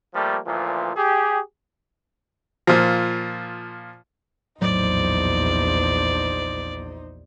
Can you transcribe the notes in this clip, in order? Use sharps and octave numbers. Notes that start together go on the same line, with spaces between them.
F3 G3 A3 A#3
D2 A#2 E3 F3
G4 G#4
A#2 F3
A#1 E2 A2 F#3 D#4 C5 D5